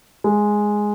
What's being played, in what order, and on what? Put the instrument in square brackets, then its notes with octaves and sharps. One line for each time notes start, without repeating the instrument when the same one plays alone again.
[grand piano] G#3